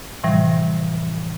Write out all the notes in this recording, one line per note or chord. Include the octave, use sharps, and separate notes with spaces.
A2 C3 E3 F3 G3